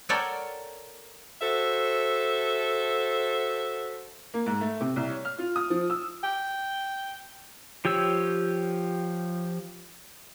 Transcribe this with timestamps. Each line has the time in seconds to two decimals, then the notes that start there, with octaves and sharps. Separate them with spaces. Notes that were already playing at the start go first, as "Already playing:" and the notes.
0.09 A4 A#4 C#5 D5 F#5 G5
1.40 F#4 A4 C5 E5
4.34 A#3
4.46 G#2
4.61 A3
4.81 C3
4.96 C2
5.10 C#5
5.25 F6
5.39 F4
5.56 D#6
5.70 F3
5.90 E6
6.24 G5
7.85 F3 G4 C#5 E6